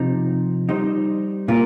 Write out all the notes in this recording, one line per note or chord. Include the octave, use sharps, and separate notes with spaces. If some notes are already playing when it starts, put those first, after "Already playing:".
Already playing: C3 F3 D#4
G3 D#4 C5
A#2 A#3 F4 A#4